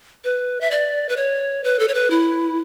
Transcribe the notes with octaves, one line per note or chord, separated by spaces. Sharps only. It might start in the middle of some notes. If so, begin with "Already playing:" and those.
B4
E5
D5
B4
C#5
B4
A4
C#5
B4
E4